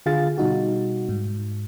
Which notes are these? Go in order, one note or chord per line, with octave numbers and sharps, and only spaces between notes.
D3 F4 G#4 F5 A6
B2 G3 D#4 F#4
G#2